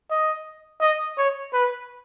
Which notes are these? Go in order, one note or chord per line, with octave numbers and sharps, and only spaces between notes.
D#5
D#5
C#5
B4